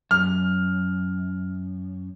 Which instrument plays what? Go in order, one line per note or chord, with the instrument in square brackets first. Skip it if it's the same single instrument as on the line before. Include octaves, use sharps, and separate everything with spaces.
[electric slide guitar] F#2 [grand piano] F6